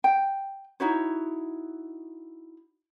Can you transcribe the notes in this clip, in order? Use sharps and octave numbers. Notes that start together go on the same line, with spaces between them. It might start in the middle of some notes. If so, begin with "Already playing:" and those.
G5
D#4 E4 F#4 C#5